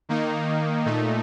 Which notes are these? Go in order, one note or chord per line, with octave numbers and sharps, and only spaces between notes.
D#3 A#3 D#4
A#2 A3 D#4